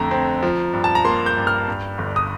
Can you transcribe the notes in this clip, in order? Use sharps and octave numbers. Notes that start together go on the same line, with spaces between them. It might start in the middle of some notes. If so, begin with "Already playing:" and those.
Already playing: F2 D3 A3 A#5
C4
F3
G2
A5
A#5
A#3 C6
G6
G2
F6
G2
G1
D#6